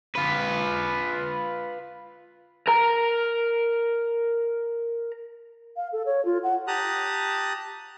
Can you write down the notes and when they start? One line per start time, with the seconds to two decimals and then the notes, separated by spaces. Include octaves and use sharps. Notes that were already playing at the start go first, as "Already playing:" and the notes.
0.15 F4 B4
2.68 A#4 A#5
5.76 F5
5.92 A4
6.06 C#5
6.25 F4
6.43 F#5
6.68 G4 A5 A#5 D#6 F#6